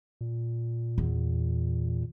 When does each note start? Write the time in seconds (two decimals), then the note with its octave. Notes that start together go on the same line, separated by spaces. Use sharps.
0.21 A#2
0.98 E2